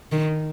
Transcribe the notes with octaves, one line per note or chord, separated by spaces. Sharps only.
D#3